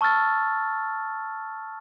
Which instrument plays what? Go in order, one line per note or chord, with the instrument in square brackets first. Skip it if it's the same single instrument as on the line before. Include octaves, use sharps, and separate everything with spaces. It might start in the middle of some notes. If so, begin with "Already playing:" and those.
[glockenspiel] A5 C#6 E6 F6 A6